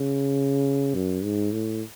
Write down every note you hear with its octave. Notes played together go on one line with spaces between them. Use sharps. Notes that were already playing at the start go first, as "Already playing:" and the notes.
Already playing: C#3
F#2
G#2
A2